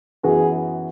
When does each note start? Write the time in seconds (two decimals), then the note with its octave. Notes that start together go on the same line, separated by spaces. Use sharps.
0.23 F#2 E3 B3 F#4 G#4